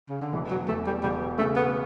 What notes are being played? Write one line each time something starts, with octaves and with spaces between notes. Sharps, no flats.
C#3
D3
E1 E3
F#3
E2 A3
G3
E1 G3
C#3 A3
B3